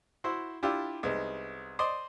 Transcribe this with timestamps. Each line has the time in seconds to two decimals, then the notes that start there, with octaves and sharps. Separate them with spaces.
0.24 E4 F#4 C5
0.63 D4 E4 F4 G4
1.03 C2 G#3 B3 D#4
1.79 C5 D5 D#5 C6